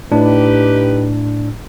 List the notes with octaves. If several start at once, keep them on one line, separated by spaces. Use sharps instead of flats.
A2 D4 D#4 G4 B4